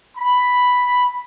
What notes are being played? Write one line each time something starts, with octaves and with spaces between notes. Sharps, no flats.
B5